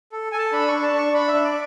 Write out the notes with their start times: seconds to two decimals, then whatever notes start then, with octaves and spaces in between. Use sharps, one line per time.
0.12 A4
0.32 A4 G#5
0.38 A5
0.52 D4 B5
0.68 D4 C#6
0.83 A5
0.93 D4 C#6
1.13 D4 B5
1.28 E5
1.33 D4
1.44 D5